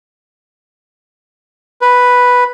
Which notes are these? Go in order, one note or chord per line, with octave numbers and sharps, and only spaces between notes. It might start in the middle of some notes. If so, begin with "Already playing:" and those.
B4